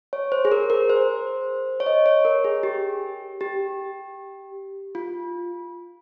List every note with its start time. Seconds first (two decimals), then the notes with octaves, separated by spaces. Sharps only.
0.13 C#5
0.32 C5
0.45 G#4
0.52 A#4
0.70 A#4
0.90 C5
1.80 C#5
1.86 D#5
2.06 C#5
2.25 A#4
2.44 G#4
2.63 G4
3.41 G4
4.95 F4